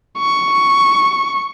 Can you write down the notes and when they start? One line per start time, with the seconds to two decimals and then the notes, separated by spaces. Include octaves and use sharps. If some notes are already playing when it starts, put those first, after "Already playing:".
0.19 C#6